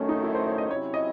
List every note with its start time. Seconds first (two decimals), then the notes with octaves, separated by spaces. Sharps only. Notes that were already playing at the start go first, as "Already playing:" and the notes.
Already playing: F#2 D#3 A3 C#4
0.09 D#4
0.23 E4
0.35 C5
0.47 C#5
0.58 D#5
0.71 C3 F#3 C#4 E4 C#5
0.94 D#5